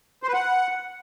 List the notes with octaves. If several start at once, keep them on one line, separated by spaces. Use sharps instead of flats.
C5
B4
F#5